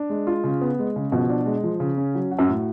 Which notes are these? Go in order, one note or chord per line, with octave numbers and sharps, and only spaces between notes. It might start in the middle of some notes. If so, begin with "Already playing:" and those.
Already playing: D4
G#3
F4
C#3
B3
G#3
C#3
B2 F3
D4
G#3
F3
C#3
C#4
F#3
F#4
F#2
A2